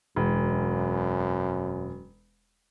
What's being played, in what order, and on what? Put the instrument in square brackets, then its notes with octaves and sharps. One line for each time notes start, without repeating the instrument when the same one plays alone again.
[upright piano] E1 [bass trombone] F#2